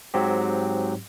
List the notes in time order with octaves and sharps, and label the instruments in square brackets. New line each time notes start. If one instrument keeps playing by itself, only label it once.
[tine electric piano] G#2 F#3 C4 G4